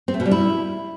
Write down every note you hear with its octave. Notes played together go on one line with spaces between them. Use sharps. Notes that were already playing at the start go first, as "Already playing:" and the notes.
C4
A3
B2
G3
E4